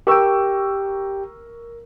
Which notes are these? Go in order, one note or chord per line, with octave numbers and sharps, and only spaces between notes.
G4 A#4 G5 C#6 E6